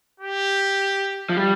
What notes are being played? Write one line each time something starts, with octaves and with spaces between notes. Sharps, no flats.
G4
F3
G3